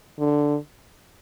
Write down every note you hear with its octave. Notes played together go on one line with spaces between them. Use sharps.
D3